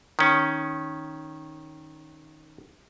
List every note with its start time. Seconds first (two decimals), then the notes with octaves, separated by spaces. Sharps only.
0.19 D#3 C#4